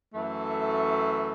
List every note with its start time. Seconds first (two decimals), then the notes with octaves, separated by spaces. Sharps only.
0.13 F#2 E3 A3